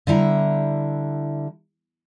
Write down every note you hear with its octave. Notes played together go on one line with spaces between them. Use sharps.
D3 G3 E4 A#5